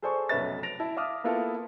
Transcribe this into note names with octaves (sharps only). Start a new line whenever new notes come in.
G#4 A4 C5 D5 G#5 C#6
F1 B1 C#4 B4 E5 A6
A#6 D7 F7
E4 A5
E5 F5 D6 D#6 F6
A#3 B3 E4 F4 A4 A#4